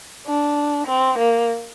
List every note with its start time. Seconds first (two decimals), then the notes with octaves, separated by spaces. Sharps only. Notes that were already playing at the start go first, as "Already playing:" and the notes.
0.27 D4
0.87 C4
1.18 A#3